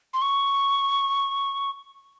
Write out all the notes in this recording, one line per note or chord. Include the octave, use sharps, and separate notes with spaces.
C6
C#6